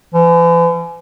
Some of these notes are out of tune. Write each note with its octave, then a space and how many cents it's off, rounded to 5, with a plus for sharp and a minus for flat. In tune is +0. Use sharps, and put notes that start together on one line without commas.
E3 +45